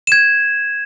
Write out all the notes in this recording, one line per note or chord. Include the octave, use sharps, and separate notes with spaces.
G#6 E7